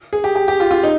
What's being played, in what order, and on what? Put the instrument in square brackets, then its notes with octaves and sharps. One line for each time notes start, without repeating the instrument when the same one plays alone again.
[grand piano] G#4
G4
G4
G4
F4
F4
D#4